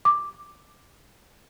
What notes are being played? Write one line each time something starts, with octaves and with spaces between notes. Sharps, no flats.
D6